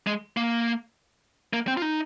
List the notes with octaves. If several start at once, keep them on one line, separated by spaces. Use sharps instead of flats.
G#3
A#3
A#3
C4
F4
D#4